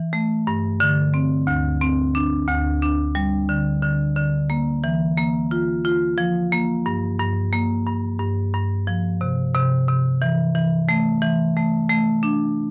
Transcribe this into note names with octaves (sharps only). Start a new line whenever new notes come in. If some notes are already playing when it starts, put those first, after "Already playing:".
Already playing: E3
A3
G2
D3
C4
D2
C4
D4
D2
D4
G3
D3
D3
D3
A#3
E3
A#3
F4
F4
F3
A#3
G2
G2
A#3
G2
G2
G2
F3
C3
C3
C3
E3
E3
A3
E3
A3
A3
D4